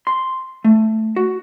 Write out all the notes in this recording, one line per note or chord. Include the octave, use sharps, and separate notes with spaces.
C6
A3
F#4